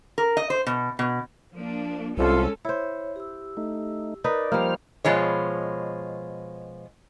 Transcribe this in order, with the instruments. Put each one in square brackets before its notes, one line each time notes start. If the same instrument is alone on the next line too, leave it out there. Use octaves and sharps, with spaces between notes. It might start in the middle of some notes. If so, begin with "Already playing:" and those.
[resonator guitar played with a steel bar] A#4
D#5
C5
B2
B2
[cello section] F3 A#3 D4
[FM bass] C2 [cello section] G#3 C#4 A4 [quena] F4
[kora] E4 C5 [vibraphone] C#5
[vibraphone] G4 E6
[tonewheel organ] A3 D#4
[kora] D#4 B4 [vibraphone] A#4 [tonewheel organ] D5
[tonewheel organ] F3 C5 F6 [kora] G3 A#3
[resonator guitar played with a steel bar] B2 F3 G#3 C#5